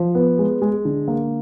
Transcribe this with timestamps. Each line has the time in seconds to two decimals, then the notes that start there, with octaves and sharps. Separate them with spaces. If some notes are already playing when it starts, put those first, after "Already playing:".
Already playing: F3
0.15 B3
0.39 G#3
0.62 G#3
0.85 D3
1.08 A#3